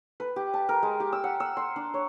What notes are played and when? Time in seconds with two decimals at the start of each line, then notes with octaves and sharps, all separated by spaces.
0.20 B4
0.36 G4
0.54 A5
0.69 A#4
0.83 G#3
1.00 G4
1.13 E6
1.24 F#5
1.40 E6
1.57 C6
1.76 D4
1.94 C#5